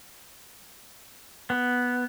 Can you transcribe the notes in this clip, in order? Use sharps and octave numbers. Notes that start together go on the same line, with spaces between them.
B3